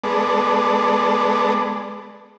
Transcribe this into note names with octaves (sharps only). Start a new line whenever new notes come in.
G#3 B3 A4 D5